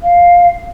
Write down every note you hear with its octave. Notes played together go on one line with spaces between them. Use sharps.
F5